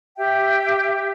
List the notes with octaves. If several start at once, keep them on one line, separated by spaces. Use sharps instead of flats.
G4 E5 G5